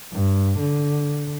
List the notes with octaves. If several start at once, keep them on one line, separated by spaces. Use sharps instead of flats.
G2
D3